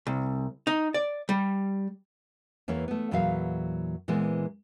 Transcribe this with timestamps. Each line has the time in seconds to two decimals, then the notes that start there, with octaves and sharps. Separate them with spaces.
0.07 C2
0.67 D#4
0.94 D5
1.29 G3
2.68 E2 E3 A#3 C#5
2.88 A3 B3
3.11 E2 A#2 E3 F#3 E5 F5
4.08 A#2 E3 G#3 B3 C4